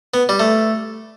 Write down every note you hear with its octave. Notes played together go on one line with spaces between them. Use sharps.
B3
G3
A3